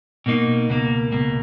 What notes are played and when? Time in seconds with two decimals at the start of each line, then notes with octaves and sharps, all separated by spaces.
0.26 B2 A#3 D#4
0.69 C#2 B2 A#3
1.12 C#2 B2 A#3